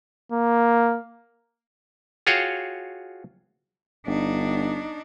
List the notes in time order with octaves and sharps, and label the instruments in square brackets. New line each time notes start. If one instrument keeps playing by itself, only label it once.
[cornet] A#3
[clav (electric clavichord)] F4 F#4 G#4 C#5 F5 G5
[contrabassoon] G1 [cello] D4 D#4